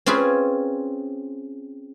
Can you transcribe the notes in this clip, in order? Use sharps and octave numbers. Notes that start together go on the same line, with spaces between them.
C4 C#4 F4 G#4 B4